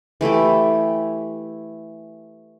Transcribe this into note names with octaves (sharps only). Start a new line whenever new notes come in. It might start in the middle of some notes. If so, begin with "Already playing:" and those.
E3 A3 E4 G4